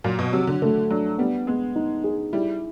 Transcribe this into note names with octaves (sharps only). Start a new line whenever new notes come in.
A#2 F#3
B2
C3 F#3
D3
D3 A3
F#3 D4
G3 B3
G#3 B3
D#4
G#4
G3 E4